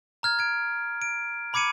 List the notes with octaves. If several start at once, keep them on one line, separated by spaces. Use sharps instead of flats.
A#5 F6 G#6
G#6 D7
D7
A#5 B5 D6 G#6 C#7 D#7